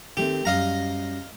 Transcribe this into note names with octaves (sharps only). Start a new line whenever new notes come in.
D#3 A3 C4 G4
F#2 G3 D#5 F5 A#5